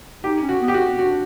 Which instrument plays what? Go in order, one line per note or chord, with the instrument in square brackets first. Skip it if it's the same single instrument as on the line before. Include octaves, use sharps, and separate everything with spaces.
[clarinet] D#4 [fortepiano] G4
[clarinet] C#4
[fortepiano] F#4
[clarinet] B3
[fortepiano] G4
F#4
[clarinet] C4
[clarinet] D4 [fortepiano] F#4